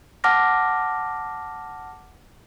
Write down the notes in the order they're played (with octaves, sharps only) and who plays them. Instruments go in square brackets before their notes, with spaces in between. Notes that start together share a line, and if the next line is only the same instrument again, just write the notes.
[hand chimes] F#5 A5 D6 F6 A#6